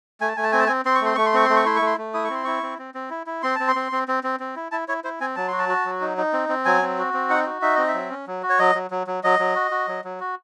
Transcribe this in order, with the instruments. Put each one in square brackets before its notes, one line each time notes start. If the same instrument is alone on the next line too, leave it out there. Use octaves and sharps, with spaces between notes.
[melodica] A3 G#5
A5
A3 G#5
A5
C4 G#5
A5
C4 G#5
C4 C6
C#6
A3 C6
A3 C#6
C6
C4 C#6
A3 C6
C#6
E4 C6
C#6
A3
C6
A3
E4 D#6
C#6
C4 C6
E4 C#6
C4
C4
C4
E4
E4
C4 C6
C4 A5
C6
C4
C4
C4
C4
C4
E4
E4 A5
E4 C#5
E4 C5
C4 G#5
F#3 A5
F#4 C6
A5
F#4
F#3
D#4
D#4
C4
C4
F#3 G#5
C4
F#4
C4
D#4 F#5
F#4
D#4 E5
C4 D#5
E5
F#3
C#4
F#3
F#4
C#5
F#3 D#5
F#3
F#3
F#3
F#3 D#5
F#3
F#4
F#4
F#3
F#3
F#4